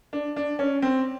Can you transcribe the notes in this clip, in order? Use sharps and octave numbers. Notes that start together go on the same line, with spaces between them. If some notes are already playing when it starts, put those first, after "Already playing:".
D4
D4
C#4
C4